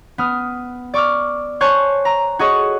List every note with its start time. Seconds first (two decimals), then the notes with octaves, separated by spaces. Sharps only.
0.18 B3 D#6 F6
0.94 D5 C#6 D6 E6 F6
1.61 C5 C#5 G#5 A5 C#6 F#6
2.05 A#5
2.39 F#4 G#4 A4 C#5 D#5 C#6